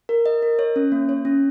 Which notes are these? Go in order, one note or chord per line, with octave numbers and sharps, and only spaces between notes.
A#4
D#5
A#4
C#5
C#4
A#3
C#5
C#4